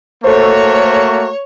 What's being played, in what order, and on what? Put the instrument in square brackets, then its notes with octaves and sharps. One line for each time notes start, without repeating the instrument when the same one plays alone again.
[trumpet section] A3 A#3 F#4 [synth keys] A4 C5 [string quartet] C#5